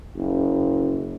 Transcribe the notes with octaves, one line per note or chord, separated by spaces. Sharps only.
F#1